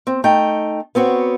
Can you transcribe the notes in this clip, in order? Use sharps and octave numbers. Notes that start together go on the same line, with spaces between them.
C4
A3 D#4 G5
B3 C4 F#4 C#5